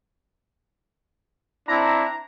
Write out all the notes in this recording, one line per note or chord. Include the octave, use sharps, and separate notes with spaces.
C4 D4 E4 A#5